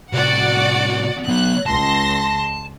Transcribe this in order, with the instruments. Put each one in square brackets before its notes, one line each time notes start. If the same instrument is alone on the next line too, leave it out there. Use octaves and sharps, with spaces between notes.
[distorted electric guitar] A2 C3 [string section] F#4 D5 F#5
[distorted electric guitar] F#3 B3 [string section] F#6
[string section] C#2 C6 A#6 [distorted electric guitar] A5